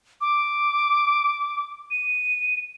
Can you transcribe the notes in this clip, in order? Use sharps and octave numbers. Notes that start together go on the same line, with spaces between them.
D6
D#7